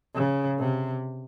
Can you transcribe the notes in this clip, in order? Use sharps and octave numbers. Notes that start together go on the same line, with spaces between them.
C#3
C3